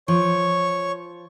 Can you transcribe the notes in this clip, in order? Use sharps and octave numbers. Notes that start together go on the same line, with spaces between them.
F3 C#5 C#6